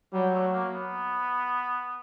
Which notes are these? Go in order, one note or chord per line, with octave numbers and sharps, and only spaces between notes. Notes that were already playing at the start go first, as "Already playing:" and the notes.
F#3 G3
A3
A#3
B3